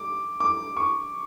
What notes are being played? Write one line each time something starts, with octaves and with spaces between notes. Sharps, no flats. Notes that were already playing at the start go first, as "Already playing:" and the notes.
Already playing: D6
D6
C#6